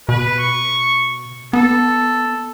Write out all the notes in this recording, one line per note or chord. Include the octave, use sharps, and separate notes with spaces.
B2 B4
C#6
B3 A4